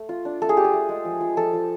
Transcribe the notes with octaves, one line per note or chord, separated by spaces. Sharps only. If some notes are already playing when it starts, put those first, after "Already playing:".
Already playing: A3
F4
D4
A3 A4
G#4
F4 G4
G#4
A3
G#3
F3
F3
F3 A4
F3